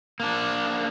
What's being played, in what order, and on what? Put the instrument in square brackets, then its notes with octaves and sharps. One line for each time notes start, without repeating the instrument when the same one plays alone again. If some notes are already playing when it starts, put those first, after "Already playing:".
[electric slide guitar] A#3 D4